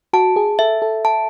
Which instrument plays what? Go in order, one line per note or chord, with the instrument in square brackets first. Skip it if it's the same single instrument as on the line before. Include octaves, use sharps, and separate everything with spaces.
[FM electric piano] F#4 [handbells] A5
[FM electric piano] G#4
[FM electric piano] A4 [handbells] E5
[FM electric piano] A4
[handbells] A5